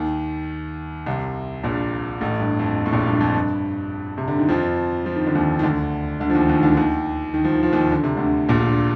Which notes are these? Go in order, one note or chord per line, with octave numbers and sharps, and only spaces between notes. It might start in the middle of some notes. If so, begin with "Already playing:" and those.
Already playing: D#2 D#3
C2 C3
A#1 A#2
A1 A2
G2
F2
A2
A#1 A#2
G2
F2
G2
C3
D3
D#3
F2 F3
F3
D#3
D3
D#2 D#3
D#3
D2 D3
D2 D3
F3
D#2 D#3
D#2 D#3
D#3
D2 D3
D#2 D#3
D#3
F3
D#3
F3
D#2 D#3
D3
C3
D2 D3
A#1 A#2